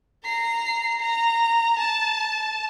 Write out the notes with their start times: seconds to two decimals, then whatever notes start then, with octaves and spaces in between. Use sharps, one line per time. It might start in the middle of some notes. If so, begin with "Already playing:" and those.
0.24 A#5 C7
0.99 A#5
1.79 A5